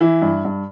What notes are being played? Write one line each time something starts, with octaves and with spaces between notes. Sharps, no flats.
E3 E4
G2
G2